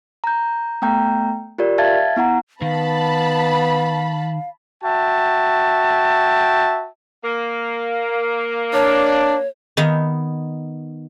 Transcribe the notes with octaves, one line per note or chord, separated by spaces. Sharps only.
A#5 G6
A3 B3 G5 A#5 G6
F4 G4 A#4 D5
E5 F5 A5 G#6 A6
B3 E4 F#5 A#5
D#3 B3 F5 A5 B5
F#4 E5 G5 A5
A#3
D4 C#5
D#3 B3 D#4 E5